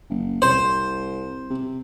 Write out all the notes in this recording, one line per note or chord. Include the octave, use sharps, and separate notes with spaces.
F#1
C2 C5
C3